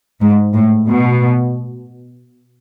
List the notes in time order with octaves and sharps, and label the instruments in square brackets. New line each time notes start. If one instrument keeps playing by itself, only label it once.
[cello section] G#2
A2
B2